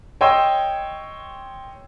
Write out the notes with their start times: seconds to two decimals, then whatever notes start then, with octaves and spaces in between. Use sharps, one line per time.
0.21 C#5 D#5 G5 C6 E6